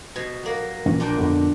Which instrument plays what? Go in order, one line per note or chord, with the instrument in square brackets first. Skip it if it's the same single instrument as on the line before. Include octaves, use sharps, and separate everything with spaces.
[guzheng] B2
F#3 A#3
[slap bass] A#2 E3 C#4
[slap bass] A#1 [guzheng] A#2 D4 G5
[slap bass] F2 D3 B3